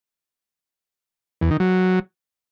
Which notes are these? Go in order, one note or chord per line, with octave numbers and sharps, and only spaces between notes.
E2
D#3
F#3